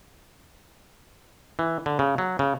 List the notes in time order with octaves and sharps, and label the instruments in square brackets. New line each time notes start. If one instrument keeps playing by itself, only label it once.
[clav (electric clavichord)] E3
D3
C#3
F#3
C#3